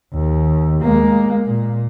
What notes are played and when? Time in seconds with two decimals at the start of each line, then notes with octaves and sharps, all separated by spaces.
0.13 D#2
0.81 G#3 A#3
1.47 A#2